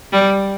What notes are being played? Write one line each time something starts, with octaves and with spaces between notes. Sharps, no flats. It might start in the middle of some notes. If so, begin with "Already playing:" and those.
G3